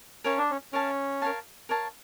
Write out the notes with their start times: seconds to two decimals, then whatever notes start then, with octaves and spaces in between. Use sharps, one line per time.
0.24 C#4 A#4 C#5 F5 A5
0.38 D4
0.51 C#4
0.73 C#4 A#4 C#5 F5 A5
1.22 A#4 C#5 F5 A5
1.69 A#4 C#5 F5 A5